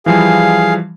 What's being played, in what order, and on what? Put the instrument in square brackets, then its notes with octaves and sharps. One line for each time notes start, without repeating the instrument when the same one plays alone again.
[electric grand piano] E3 F3 G3 [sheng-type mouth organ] G#4 F5